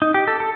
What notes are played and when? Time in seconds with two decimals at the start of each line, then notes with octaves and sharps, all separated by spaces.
0.02 D#4
0.14 G4
0.28 A4
0.40 A4